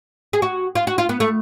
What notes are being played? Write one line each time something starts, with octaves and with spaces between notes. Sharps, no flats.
G#4
F#4
F4
F#4
F4
B3
A3